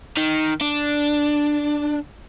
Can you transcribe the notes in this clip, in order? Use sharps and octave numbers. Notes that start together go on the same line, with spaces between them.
D#3
D4